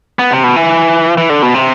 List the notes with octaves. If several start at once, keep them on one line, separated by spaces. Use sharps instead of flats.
B3
C3
B2
E3
E3
D3
B2
C3